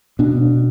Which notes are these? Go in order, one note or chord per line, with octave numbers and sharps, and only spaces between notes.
B2 D4